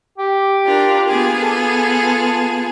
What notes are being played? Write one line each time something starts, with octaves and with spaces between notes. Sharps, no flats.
G4
D4 F4 A#4
B3 F4 G#4
A4